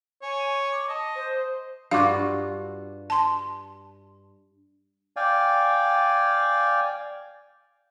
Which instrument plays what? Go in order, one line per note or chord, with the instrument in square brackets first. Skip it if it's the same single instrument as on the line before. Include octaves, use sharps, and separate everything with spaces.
[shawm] C#5 [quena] G#5
[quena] D6
[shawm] D#5 [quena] A5
[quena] C5
[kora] G2 F4 F#4 [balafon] F5 D6
[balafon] A5 C6
[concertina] D5 F5 G5 G#5